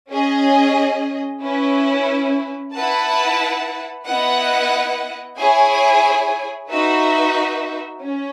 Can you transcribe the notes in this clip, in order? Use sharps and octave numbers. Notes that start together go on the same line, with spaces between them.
C#4 G#4 D#5
C#4 E4 B4
E4 B4 F#5 A5
B3 E4 B4 D#5 F#5
E4 G#4 C#5 G#5
D#4 F#4 B4 E5
C#4